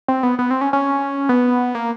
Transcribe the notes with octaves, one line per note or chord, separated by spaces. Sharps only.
C4
B3
B3
C4
C#4
C#4
B3
A#3